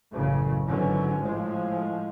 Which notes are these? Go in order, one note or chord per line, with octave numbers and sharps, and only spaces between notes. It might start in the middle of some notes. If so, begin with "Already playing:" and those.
A1 F#2 A2 C#3 A3
G#1 D3 E3 F#3 C#4
A2 F3 G#3